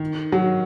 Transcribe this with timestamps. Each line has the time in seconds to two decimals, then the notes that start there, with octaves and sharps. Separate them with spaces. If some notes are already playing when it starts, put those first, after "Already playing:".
Already playing: D#3
0.32 F#3